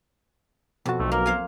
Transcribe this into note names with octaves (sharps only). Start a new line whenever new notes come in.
F2 B2 F#4 A5
B1 A3
A#3 A#4
C5 F5 G#5